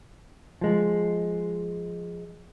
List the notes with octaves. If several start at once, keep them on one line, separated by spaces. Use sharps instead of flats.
F3 G#3